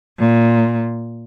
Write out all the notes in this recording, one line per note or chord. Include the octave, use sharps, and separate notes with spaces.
A#2